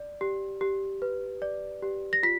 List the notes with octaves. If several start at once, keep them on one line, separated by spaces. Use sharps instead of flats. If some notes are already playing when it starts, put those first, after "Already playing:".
Already playing: D5
G4
G4
B4
D5
G4
A#6
F4 B6